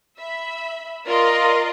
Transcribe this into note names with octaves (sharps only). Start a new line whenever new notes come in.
E5 B5
F4 A#4 D5 D#5